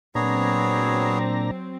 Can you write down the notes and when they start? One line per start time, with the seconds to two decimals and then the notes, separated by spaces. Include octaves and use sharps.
0.15 A#2 F#3 B3 C4 D4 G#4 C#5 A#5